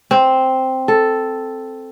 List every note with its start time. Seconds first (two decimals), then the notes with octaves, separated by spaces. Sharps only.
0.11 C4
0.88 A4